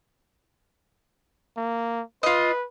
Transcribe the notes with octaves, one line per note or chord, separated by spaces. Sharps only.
A#3
F4 B4 D#5